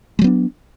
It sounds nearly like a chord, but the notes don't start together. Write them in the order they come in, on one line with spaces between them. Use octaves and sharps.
G#3 F#3 B3 D4